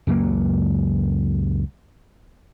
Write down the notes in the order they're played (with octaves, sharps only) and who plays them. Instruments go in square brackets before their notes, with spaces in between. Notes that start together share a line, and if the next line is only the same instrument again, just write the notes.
[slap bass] C#2 F#2 F#3 A#3